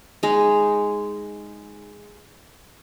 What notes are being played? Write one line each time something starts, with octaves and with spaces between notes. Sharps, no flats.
G#3 D#4